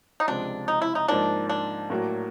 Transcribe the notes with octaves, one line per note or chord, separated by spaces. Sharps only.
D#4
C#2 C3 F3 G#3 D4
D#4
E4
D#4
G#2 F3 A#3 D4 D#4
D4
A2 F#3 A#3